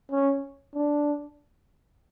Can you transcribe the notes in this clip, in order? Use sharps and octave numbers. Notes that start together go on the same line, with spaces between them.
C#4
D4